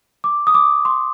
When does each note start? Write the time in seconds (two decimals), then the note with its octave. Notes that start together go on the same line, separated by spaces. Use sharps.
0.24 D6
0.47 D#6
0.54 D6
0.85 C6